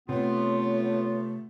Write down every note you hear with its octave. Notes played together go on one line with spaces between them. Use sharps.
C3 A3 B3 F4 C#5